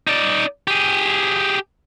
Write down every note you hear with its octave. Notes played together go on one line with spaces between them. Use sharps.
D#4 D5
G4 G#4